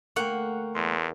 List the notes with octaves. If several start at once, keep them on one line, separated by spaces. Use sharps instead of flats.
D2 A3 A#3 F#5 G5 C#6
E2 C6